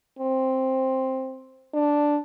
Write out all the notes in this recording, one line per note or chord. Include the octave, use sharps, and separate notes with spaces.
C4
D4